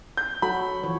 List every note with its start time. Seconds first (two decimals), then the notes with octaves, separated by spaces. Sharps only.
0.17 G6
0.42 F#3 F#4 A4 B5
0.83 E3 F3 C#5